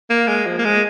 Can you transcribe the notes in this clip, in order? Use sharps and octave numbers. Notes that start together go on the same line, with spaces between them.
A#3
G#3
F3
A#3
G#3